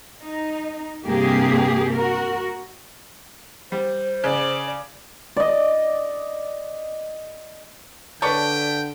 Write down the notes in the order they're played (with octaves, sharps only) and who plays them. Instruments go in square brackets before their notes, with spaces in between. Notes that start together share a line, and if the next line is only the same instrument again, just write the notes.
[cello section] D#4
G2 C3 A#3 G4 G#4
F#4 A#4
[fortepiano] G3 [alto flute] C5
[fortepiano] C#3 [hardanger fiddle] D5
[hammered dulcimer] D5 D#5
[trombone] D3 [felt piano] B4 A5 [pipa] C#5 D5 [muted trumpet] G5